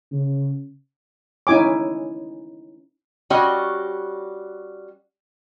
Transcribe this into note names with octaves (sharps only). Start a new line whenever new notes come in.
C#3
C#4 D#4 E4 G#5 D6
G3 C#4 F#4 D#5